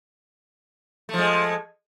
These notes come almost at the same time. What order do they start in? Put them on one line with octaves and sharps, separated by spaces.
A3 F3 G#3